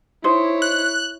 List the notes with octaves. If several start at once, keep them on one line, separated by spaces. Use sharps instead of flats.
D#4 E4 C5 C#5
F#6